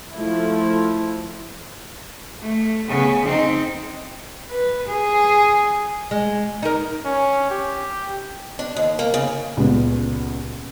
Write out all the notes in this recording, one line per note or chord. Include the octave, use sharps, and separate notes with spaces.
F3 A3 E4
A3
C#3 B3
C4 D#4
B4
G#4
G#3
D#4 A#4
C#4
G4
D4
D#2
A#3
C#3
C#2 A#2 G3 B3